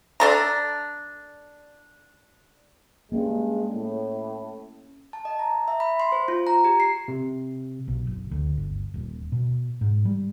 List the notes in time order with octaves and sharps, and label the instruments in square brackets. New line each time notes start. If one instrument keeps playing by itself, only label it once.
[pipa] D4 A4 A#5
[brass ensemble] G2 G#3 [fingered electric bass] A#3 C#4
[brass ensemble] A2
[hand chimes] A5
D#5
A#5
E5
B5
C6
C5
F4
A#5
G4
C7
[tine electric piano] C3
[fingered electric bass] B1
F#1
D2
G1
D#1
B2
G#2
G3